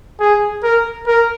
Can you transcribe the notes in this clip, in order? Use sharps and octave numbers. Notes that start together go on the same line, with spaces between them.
G#4
A#4
A#4